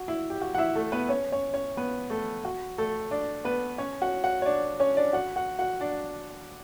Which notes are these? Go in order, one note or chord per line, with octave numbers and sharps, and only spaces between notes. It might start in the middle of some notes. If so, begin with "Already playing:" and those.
Already playing: F#4
E4
G4
F#4
F#5
E4 E5
A3 A4
B3 B4
C#4 C#5
C#4 C#5
C#4 C#5
B3 B4
A3 A4
F#4
A3 A4
D4 D5
B3 B4
C#4 C#5
F#4 F#5
F#4 F#5
C#5
D4 D5
C#4 C#5
D4 D5
F#4 F#5
F#4 F#5
F#4 F#5
D4 D5